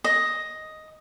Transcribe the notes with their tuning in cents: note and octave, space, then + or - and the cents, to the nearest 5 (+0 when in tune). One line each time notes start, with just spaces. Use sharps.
D#5 +5